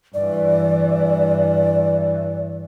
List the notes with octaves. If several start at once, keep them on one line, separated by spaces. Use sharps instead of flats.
G2 E3 D5